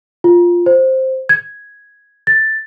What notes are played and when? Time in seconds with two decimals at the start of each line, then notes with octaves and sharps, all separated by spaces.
0.24 F4
0.66 C5
1.29 G#6
2.27 A6